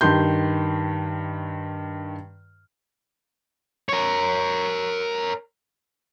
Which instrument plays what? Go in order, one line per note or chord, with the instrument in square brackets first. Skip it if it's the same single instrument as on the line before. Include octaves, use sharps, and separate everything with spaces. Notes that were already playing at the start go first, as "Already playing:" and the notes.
[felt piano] G2 D#3 C6 G6
[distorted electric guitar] A#4 C#5